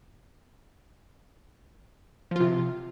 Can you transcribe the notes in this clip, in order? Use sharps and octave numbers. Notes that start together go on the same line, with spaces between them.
C3 F3 F4